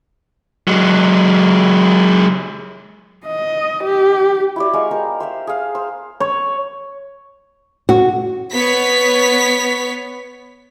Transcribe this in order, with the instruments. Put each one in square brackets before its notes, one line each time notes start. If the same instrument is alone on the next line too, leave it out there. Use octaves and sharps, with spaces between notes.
[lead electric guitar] F#3 G#3
[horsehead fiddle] D#5
G4
[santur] E4 F#4 D5
G#3 F5 C#6
G4 A#4 C5
C5 E5 F5
G#4 F5
C5
[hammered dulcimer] C#5
[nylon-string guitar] F#4
[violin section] B3 C#5 B6